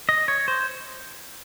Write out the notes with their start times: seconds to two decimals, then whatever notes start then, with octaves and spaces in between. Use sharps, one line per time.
0.09 D#5
0.28 C#5
0.48 C5